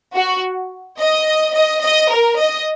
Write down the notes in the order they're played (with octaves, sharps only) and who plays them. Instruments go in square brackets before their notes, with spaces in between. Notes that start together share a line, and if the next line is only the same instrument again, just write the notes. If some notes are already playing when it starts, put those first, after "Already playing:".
[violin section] F#4
D#5
D#5
D#5
A#4
D#5